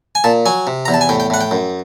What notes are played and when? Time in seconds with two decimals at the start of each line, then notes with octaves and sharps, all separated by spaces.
0.15 G#5
0.24 A#2 A5
0.46 F#3 G#5
0.67 C3
0.85 A#5
0.88 E2
0.94 A5
1.01 G#5
1.09 A2 G5
1.20 G5
1.30 A2 F#5
1.41 G5
1.51 F#2